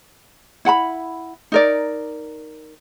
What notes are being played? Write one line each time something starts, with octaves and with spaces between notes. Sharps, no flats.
E4 F#5 A5 B5
D#4 A#4 D5